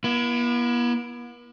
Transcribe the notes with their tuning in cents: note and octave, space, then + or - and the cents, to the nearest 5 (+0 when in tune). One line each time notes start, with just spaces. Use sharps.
B3 -45 E4 +25